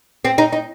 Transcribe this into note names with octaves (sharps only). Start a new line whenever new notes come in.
C4
D#4
D#4